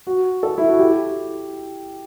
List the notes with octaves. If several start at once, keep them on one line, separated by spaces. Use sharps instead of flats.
F#4
A4
E4
F#4
G4